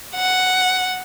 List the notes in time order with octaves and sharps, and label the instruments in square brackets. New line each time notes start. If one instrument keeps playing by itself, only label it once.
[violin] F#5